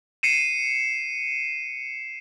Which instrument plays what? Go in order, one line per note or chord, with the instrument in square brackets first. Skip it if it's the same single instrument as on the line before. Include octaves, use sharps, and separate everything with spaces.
[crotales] C7 C#7 D#7 E7